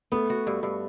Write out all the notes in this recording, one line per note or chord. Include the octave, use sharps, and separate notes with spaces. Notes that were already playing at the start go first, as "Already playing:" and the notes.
A3 B3
F#4
G2
G2